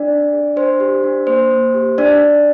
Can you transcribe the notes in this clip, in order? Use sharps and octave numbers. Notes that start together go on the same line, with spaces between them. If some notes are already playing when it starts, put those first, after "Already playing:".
Already playing: D4 D5
C4
G#4
D4 C5
G4
D4
A#3 C5
A#3
G4
D4 D5
D4